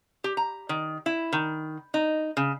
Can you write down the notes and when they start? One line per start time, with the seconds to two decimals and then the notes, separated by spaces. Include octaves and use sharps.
0.24 G4
0.37 A#5
0.69 D#3
1.06 E4
1.33 D#3
1.94 D#4
2.37 C#3